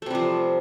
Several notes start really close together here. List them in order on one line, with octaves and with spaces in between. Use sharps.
A3 C3 G3 F3